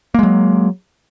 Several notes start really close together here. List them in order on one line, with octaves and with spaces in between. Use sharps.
A#3 G#3 F#3